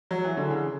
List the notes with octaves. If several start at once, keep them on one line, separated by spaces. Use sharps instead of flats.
F#3
E3
D3
C#3